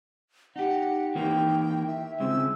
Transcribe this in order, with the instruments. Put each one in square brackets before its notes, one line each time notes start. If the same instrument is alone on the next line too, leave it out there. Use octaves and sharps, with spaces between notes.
[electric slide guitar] D#4 G4 [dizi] F#5
[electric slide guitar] E3 A#3 D#4 [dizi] G5
[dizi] E5
[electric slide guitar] C#3 G#3 C4 [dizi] E6